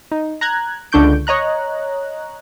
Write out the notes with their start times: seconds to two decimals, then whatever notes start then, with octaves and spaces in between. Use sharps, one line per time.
0.12 D#4
0.41 A#5 F#6 G#6
0.92 C#2 D3 D4 C#6 G6 D7
1.27 C#5 D#5 A#5 F#6